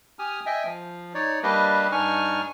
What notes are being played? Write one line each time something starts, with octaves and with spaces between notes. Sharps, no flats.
G4 G#5 D#6 F6
D#5 E5 G5 G#5
F3
D#4 C#5 D5
G3 A#3 D4 G4 B4 D#5
G2 D4 D#4 G#5 C#6 F6